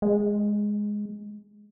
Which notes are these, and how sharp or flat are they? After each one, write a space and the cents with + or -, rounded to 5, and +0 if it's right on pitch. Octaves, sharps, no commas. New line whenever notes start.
G#3 +0